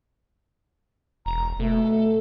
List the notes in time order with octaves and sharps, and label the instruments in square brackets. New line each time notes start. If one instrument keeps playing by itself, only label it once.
[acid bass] E1 [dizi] A#5
[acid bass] B2 [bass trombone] A3 [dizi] A4